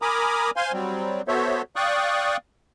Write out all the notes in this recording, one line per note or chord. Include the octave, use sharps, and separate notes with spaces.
A#4 G#5 A#5 B5 D6 D#6
C5 F5 G#5 C6
F#3 G3 C4
B3 F#4 A4 C5 C#5 E5
D5 F5 G5 C#6 D#6 F#6